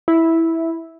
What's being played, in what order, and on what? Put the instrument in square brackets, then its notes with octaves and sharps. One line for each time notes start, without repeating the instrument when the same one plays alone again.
[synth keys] E4